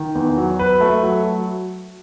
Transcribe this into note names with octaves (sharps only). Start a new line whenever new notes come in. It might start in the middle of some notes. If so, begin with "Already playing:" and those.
Already playing: D#3
E2
F#3
B4
A3
F#3